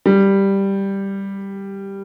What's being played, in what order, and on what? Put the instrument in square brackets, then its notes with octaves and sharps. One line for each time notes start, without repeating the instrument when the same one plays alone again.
[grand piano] G3